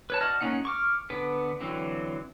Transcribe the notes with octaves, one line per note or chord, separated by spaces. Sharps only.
B4 C#5 A5
F#4 D5 D#5 A5 F6
G#3 A#3 C#4 D#4 F#5
C#6 D6 F6
D3 B3 B4
D3 E3 F#3 C4